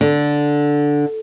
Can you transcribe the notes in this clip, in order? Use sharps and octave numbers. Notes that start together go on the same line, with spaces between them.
D3